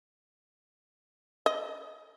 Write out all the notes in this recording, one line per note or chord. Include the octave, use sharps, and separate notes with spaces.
D#5